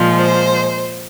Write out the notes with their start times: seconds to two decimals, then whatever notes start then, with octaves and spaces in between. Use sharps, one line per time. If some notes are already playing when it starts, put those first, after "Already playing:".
Already playing: A#2 F3 G#3
0.17 C5